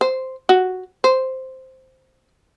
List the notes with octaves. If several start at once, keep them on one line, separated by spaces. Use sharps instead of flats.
C5
F#4
C5